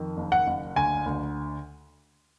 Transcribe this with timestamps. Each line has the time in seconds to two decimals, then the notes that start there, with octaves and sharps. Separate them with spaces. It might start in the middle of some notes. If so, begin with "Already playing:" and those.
Already playing: F2 D#3
0.17 F#1
0.32 F#5
0.47 F#1
0.76 D2 G#5
1.06 D2